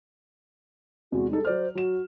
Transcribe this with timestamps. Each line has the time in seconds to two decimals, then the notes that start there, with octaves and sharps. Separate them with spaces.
1.12 E2 C3 G#3 F#4
1.31 G3 D#4 G#4 A4
1.45 F#3 C5 D5 F6
1.75 F#3 F#4 E7